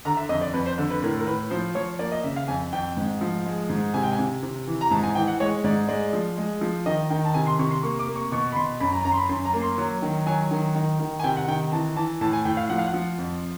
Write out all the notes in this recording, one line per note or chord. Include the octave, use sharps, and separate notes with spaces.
D3 A#5
E5
F2 D#5
D5
F2 B4
C5
D3
B4
A2 A#4
A#4
A2 B4
F3 C5
F3 C#5
A#3 D5
D#5
C#3 E5
F5
F2 G#5
F2 G5
G#2
F3
G#3
G#2
C3 G#5
G5
G#5
C3
C3
E3
A#5
G#2 A5
G#5
E3 G5
F#5
G#3 C#5
G#2 D5
G#3 D5
F3
G#3
F3
D#3 D#5
D#3 G5
A5
C3 G#5
C6
C3 C#6
C6
A#3 C#6
D6
A#3
C#6
B2 C#6
B5
B2 C6
F#2 B5
A#5
F#2 A#5
C6
B5
F#2 C6
A#5
A#3
C6
F#3
D#3
F#3 G#5
D#3
D#3
D#3
G#5
C3 G5
F#5
D#3 G5
E3 A5
E3 A5
A2 A5
G#5
A2 G5
F5
F3 F#5
F5
F#5
F3
F2